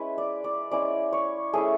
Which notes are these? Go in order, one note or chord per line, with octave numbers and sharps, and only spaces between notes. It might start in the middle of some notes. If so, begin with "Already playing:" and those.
Already playing: G#3 C#4 E4 B4
D5
D5
G#3 C#4 E4 D5
C#5
A3 C#4 E4 G#4